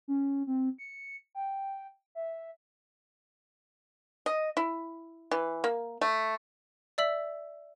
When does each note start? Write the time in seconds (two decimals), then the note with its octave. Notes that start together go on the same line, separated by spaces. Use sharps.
0.08 C#4
0.47 C4
0.78 C#7
1.35 G5
2.15 E5
4.26 D#5
4.57 E4
5.31 E3
5.64 A#3
6.01 A3
6.98 D5 E5 E6 B6 F#7